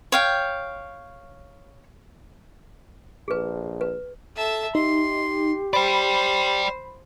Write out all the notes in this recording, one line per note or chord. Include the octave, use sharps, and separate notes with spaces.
C#5 F5 G5
A#1 G#4 B4
B4
A4 E5 A5
D#4 G4 C6
C5 D5 G5 B5